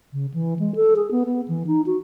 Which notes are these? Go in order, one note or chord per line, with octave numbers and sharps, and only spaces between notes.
C#3
E3
G#3
A4
G#4
B3
B3
E3
D#4
F#4